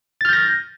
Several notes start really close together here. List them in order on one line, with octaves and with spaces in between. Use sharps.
A6 F6 G6 A#6